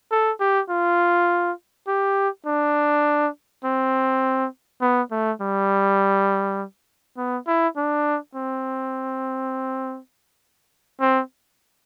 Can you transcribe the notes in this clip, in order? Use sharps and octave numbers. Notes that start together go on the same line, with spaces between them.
A4
G4
F4
G4
D4
C4
B3
A3
G3
B3
E4
D4
C4
C4